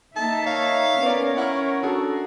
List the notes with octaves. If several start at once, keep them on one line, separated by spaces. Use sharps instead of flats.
A#3 D#4 E5 A5
C#5 F5
B3 C#4 A#4 D5
E4 F#5 F6
D4 F#4 G#4 A4